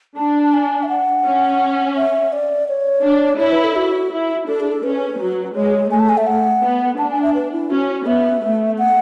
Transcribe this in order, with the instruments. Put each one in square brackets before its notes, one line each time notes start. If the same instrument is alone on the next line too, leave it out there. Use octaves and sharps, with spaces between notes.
[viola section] D4 [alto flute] A5
[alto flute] A5
G#5
E5
F#5
[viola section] C#4
[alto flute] E5
D5
C#5
[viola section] D4
[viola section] E4 [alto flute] C#5
[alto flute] B4
A4
F#4
[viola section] E4
[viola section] D4 [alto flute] A4
[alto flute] G#4
A4
[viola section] C#4 [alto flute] B4
[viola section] F#3
[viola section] G#3 [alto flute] C#5
[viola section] A3 [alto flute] G#5
[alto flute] A5
G#5
E5
F#5
[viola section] B3
[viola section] D4 [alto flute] A5
[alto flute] G#5
E5
B4
E4
[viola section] C#4 [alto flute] F#4
[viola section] B3 [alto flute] E5
[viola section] A3
[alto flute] F#5